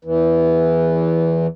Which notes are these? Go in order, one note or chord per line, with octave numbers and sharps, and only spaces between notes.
E2 E3